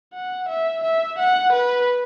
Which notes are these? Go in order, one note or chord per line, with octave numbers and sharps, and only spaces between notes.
F#5
E5
E5
F#5
B4